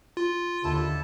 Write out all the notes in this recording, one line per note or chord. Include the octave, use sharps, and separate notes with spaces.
F4
D#2 D3 E4 A4 A5